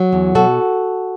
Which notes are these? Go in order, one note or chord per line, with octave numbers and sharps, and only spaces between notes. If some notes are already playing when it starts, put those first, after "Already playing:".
Already playing: F#3
E2
B2 F#4 A4